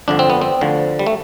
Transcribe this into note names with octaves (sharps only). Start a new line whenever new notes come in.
G1 F2 D3 D4
C4
B3
C4
D2 D3 F3
G3
A3